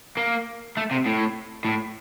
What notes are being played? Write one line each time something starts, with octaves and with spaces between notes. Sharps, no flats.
A#3
A3
C3
A2
A2